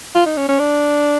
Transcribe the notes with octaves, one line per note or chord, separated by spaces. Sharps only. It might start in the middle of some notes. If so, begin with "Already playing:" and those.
F4
D#4
C#4
C#4
D4